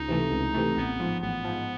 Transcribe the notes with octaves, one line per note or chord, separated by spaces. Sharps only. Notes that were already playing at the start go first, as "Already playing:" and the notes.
Already playing: C#2 D#4
C3 E3 A3
C#2
C3 E3 A3
A1 B3
G#2 F3
A1 B3
G#2 F3